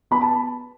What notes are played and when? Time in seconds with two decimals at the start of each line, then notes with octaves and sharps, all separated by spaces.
0.11 B3 B5
0.21 A5